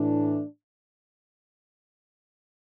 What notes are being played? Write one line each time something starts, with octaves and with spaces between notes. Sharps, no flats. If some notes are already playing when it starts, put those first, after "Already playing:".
Already playing: A2 E3 A3 D4